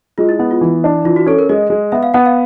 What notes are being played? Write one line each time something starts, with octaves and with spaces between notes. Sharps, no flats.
G#3 F4
E4
B3 E4
F4
E3
D4
E3 F4
F#4
C#4 A4
A#4
G#3 D#5
G#3
B3 E5
F5
B3 F#5
F5